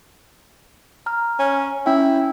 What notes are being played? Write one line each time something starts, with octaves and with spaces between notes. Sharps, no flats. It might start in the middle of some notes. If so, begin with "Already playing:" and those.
A#5 F6
C#4
C#4 E4 G5